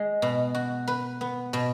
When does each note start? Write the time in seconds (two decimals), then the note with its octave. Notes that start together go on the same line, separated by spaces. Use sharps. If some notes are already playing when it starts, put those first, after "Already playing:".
Already playing: G#3
0.22 B2
0.55 F#4
0.88 B4
1.21 B3
1.53 B2